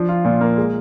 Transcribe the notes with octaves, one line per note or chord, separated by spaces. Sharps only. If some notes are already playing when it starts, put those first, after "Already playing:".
Already playing: F3 D4
F4
A#2
A#3
G#3